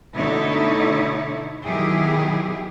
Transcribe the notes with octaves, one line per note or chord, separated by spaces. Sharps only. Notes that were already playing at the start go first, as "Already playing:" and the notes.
B2 D3 A3 D#4 E4 C#5
B2 D#3 F#3 E4 G4 G#4